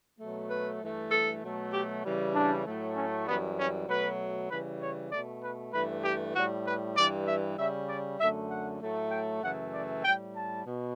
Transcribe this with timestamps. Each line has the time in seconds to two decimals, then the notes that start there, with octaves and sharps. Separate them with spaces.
0.19 B2 F#3 A3
0.50 B4
0.81 G2 E3 A3
1.12 A4
1.41 B2 F#3 A3
1.73 G4
2.03 C#3 E3 G3
2.34 D4
2.64 A2 F#3 A3
2.96 C#4
3.26 F#2 E3 G3 B3
3.58 C#4
3.88 B2 F#3 A3 B4
4.49 C#3 E3 G3 B4
4.81 C#5
5.11 B2 A3 D5
5.42 B4
5.73 G2 E3 A3 B4
6.04 G4
6.34 A2 G3 F#4
6.65 B4
6.96 G2 E3 G3 D5
7.27 E5
7.57 C#3 G3 E5
7.89 D5
8.19 F#2 D3 A3 E5
8.50 F#5
8.81 A2 F#3 A3
9.11 G5
9.41 F#2 C#3 E3 A3 F#5
9.73 D5
10.03 A2 G3 G5
10.35 A5
10.65 B2